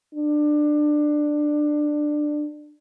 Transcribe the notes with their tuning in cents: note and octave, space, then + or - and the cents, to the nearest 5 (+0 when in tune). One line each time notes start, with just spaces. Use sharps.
D4 +20